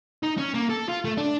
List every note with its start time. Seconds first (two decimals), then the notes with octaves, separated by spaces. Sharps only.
0.23 D#4
0.37 C#4
0.54 A#3
0.70 A4
0.89 F4
1.05 A3
1.18 D4